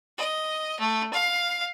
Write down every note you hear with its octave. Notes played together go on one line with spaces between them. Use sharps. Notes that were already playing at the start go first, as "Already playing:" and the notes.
D#5
A3
F5